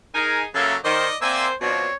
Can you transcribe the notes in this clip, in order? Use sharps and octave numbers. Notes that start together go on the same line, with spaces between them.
D#4 G#4 A#4 G#5
C#3 F#3 A#3 C#4 A4 E5
D#3 C5 D5 D#5
A#3 C4 C5 D5 E5 G#5 E6
B2 F3 C4 D4 C#5